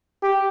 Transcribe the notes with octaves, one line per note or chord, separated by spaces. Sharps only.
G4